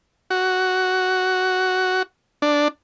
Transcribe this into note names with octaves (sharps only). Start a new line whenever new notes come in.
F#4
D4